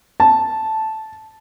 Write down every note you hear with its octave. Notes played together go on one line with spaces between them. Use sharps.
A5